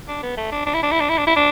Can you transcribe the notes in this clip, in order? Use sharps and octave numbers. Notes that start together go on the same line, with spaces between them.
D4
B3
A3
D4
D4
E4
D4
E4
D4
E4
D4
E4
D4